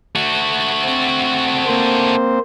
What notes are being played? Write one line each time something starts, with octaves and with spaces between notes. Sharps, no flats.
A3 F#4
C4
A#3 C4 C5